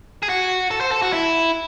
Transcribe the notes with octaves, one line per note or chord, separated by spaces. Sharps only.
G#4
F#4
A4
C5
A4
F#4
E4